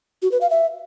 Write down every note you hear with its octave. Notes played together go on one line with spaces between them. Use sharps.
F#4
B4
F5
E5